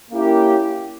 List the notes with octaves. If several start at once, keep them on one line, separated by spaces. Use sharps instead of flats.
A#3 C#4 E4 G4